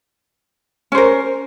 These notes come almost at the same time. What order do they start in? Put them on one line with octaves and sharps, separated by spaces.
C#4 C5 A#4